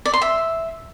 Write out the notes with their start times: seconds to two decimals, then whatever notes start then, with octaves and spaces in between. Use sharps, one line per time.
0.06 D5
0.14 C6
0.22 E5